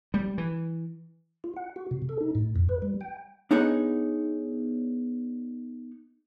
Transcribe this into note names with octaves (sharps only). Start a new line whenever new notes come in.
G3
E3
F4
F#5
F#4
C3
A4
D#4
A2
F2
B4
G3
G5
B3 D4 D#4 G#4 C#5 F#5